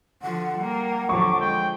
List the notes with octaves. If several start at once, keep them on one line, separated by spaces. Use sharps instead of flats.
D3 F3 F#5
G3 A#3
F2 D3 F#3 C#6 D6
G#3 G5